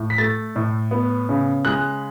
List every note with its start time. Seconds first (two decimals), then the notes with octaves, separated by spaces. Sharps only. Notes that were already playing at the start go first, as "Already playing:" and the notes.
Already playing: A2
0.10 B6
0.18 A3 A6
0.56 A2
0.91 B3
1.29 C#3
1.65 G#3 F#6